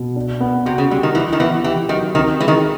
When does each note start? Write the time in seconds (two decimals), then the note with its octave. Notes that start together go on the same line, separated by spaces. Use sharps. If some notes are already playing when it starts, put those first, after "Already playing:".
Already playing: B2
0.16 D4
0.40 B3
0.66 C3 F#4
0.78 C#3
0.91 D3 G3
1.03 D#3
1.15 E3 E4
1.33 D#3
1.40 E3 B3
1.64 E3 G4
1.89 D#3 F#3
2.15 D#3 C4
2.40 E3 G#3
2.48 D#3